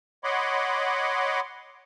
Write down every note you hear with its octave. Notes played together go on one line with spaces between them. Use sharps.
C#5 D#5 F#5 B5 C6 D6